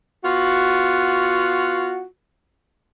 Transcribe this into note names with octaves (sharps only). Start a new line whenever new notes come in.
B3 F4 F#4